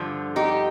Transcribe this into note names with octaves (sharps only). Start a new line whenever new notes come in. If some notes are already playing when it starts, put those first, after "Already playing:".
Already playing: G2 D3 F3
D#4 G4